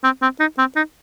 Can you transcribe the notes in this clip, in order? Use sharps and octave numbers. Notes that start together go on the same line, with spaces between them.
C4
C4
D#4
C4
D#4